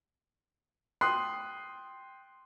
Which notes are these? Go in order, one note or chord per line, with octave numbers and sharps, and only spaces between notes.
G5 C6 D#6 F#6 C7